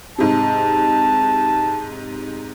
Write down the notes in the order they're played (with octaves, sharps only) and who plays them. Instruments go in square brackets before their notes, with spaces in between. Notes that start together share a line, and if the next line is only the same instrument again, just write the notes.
[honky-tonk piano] G#2 C3 [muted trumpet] A5